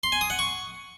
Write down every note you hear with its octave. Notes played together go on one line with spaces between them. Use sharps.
C6
G#5
D#6
F#5
C#6